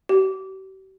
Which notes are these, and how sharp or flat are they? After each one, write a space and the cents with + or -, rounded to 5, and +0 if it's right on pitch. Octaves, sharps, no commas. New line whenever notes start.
G4 -45